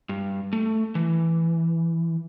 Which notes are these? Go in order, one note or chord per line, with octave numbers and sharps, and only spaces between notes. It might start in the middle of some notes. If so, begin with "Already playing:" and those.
G2
A3
E3